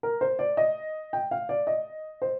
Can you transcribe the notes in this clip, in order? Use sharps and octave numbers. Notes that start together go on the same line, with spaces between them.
A#4
C5
D5
D#5
G5
F5
D5
D#5
C5